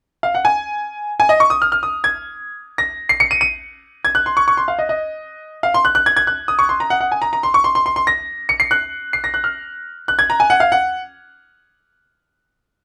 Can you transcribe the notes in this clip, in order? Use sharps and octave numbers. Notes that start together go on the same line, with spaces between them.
F5
F#5
G#5
G#5
D#5
C#6
D#6
F6
F6
D#6
G#6
A#6
C7
C#7
D#7
D#7
G#6
F#6
C6
C#6
C#6
C6
F5
D#5
D#5
F5
C6
F#6
F#6
G#6
G#6
F#6
D#6
C#6
C6
A#5
F#5
F#5
G#5
A#5
A#5
C6
C#6
C6
C6
C6
C6
A#6
C#7
C7
F#6
C7
A#6
F#6
F6
F#6
G#6
A#5
G#5
F#5
F5
F#5